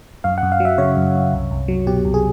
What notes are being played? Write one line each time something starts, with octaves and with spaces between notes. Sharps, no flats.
F#2 F5
F#5
F#2
F5
F#3 E5
C#3 C#5
F#2
F#2
C2
C2
F#3
B2 G4
C2
G#4